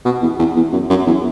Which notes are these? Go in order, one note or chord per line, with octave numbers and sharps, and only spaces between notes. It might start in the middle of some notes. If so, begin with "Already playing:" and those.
B2
E2
E2
E2
F#2
F#2
E2